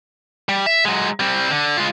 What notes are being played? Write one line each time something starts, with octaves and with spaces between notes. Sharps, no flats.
G3
E5
F#3 G#3
G3 C4
D3
G#3 F4